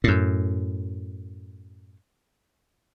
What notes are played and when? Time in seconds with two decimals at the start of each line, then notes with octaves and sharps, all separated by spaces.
0.04 F#2 A2